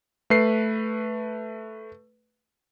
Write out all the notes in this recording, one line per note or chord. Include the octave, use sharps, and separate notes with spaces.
A3 B4 C7